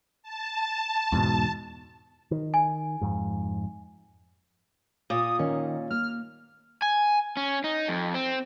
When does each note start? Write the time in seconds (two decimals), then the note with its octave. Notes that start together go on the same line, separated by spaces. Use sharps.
0.22 A5
1.12 E2 G#2 B2
2.31 D#3
2.54 G#5
3.01 F2 G#2
5.10 A#2 D#6
5.39 D#3 C#4
5.91 A#3 F6
6.82 G#5
7.37 C#4
7.64 D#4
7.88 F2
8.14 C4